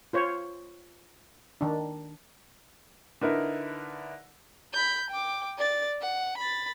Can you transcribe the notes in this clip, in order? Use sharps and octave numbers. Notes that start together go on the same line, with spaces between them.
F4 C5 C#5
D#3 D4
D3 D#4 E4 A#4 B4
B5 G6
G5 D6
D5 A6
F#5
B5 A6